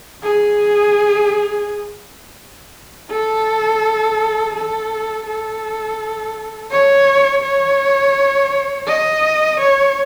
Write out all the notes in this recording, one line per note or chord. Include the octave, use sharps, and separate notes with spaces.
G#4
A4
A4
A4
C#5
C#5
D#5
C#5